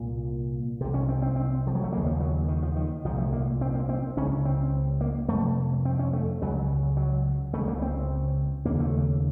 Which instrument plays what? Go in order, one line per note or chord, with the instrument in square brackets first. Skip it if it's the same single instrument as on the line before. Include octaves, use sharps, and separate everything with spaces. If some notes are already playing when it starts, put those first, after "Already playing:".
Already playing: [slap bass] C2 A#2
C2 C3
C#4
C4
C4
C4
F3
F#3
A3
D#2 C#3 A#3
F3
F#3
D#3
F3
D#3
C2 F3
A#2
A3
A#3
C4
A#3
C4
C#2 C#3 C#4
C4
A#3
F2 C3 A3
C4
C#4
A3
C#2 C#3 F#3
F#3
C#2 C#3 A3
A#3
C4
D#2 C#3 A#3
A3